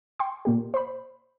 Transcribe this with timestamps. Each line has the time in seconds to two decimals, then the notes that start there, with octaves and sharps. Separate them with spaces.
0.19 G5 C6 C#6
0.45 A#2 A#3 G4
0.74 C5 B5